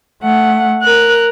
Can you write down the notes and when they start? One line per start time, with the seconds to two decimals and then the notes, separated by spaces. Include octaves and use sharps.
0.22 A3 F#5
0.82 A#4 F#6